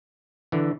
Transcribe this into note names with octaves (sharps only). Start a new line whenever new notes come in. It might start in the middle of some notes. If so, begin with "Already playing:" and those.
D3 E3